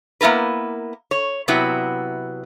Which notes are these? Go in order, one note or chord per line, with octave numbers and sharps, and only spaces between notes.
A#3 B3 E4 A#4 B4
C#5
C3 F#3 B3 E4